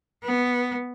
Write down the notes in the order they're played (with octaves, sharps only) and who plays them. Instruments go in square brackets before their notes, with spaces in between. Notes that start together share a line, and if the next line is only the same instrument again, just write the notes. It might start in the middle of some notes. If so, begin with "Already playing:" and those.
[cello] B3